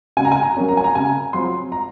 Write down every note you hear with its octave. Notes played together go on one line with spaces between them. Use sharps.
C#3 G#5
A#5
G#5
A#5
F#3 A#3 C#4
A#5
G#5
A#5
C#3 G#5
F#3 C4 F4 C6
A#5